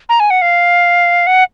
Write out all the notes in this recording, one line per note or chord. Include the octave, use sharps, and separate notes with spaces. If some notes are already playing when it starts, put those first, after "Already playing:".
A#5
G#5
F#5
F5
F#5